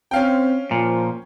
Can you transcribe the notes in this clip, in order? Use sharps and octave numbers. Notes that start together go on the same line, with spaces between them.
C4 C#4 F5 G5
A#2 F3